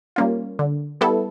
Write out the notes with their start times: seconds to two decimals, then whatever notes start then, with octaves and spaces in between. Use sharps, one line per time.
0.16 G3 A#3 C#4 F4
0.59 D3
1.01 G3 B3 E4 A4